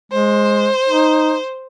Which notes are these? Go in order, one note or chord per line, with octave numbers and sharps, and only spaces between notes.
G#3 C5
D#4